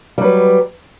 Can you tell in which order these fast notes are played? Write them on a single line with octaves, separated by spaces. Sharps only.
G3 F#3 B4